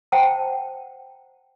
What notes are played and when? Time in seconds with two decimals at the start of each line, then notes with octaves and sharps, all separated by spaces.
0.12 C5 F#5 G5 A5 A#5